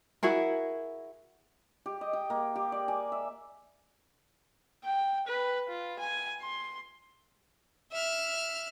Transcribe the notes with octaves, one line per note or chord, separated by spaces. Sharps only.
E4 F#4 G#4 A#4
G4
D#5
G5
A#3
G4
D5
G#5
E5
G5
B4
F4
G#5
C6
E5 F6